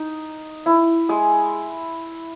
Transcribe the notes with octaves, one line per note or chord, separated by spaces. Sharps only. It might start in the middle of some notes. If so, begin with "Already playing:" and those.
Already playing: D#4
E4
G#3 G#4